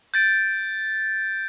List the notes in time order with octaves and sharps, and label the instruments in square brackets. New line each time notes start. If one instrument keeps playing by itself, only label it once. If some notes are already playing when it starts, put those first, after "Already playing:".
[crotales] G6 A6 D7